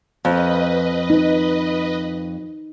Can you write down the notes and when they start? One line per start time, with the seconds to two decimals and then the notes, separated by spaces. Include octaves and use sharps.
0.25 F2 B4 D#5
1.10 D#4